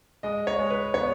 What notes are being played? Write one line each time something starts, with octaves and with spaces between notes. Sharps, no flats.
G#3 D#5
C#5
G#3
B4
B3 C#5